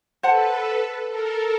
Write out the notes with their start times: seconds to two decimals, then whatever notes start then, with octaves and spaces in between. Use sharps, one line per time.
0.23 A4 B4 C5 F#5 A5
1.08 A4 A#4